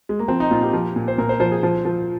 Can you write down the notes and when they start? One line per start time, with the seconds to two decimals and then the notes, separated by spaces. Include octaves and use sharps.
0.09 G#3
0.19 A#3
0.28 F3 C4
0.40 D#4
0.51 A#2 F4
0.63 G4
0.73 F3
0.96 A#2
1.08 C5
1.18 A#2 A#4
1.29 C5
1.40 F3 C5
1.52 G#4
1.63 F3 C5
1.85 F3